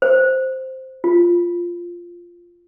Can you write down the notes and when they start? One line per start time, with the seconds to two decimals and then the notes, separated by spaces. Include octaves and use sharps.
0.02 C5
1.04 F4